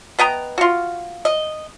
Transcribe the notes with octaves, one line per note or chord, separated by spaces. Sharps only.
B3 D#5 G5 A#5
F4 F#4
D#5